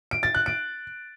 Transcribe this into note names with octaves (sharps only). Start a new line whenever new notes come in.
D7
A6
F#6
D7